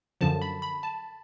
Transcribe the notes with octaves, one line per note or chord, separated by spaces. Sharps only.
F#2 D3 F3 A5
B5
B5
A5